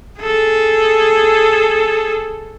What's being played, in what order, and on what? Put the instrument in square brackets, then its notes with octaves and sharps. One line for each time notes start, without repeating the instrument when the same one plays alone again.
[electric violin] G#4 A4